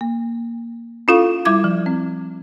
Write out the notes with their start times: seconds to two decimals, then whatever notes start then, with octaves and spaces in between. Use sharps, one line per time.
0.01 A#3
1.08 C#4 E4 F4 A4 F5 C#6
1.45 G3 E4 E5 D6 G#6
1.64 F3
1.86 C4